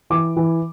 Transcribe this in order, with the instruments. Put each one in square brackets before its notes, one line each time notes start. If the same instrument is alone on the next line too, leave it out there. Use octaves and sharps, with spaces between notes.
[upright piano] E3 D6
E3